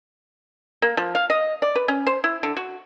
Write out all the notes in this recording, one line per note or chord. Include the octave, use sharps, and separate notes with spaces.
A#3
F3
F5
D#5
D5
B4
C#4
C5
E4
D3
F#4